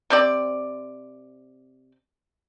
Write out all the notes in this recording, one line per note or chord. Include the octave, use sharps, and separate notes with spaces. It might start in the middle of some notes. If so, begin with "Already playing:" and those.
C3 C4 D5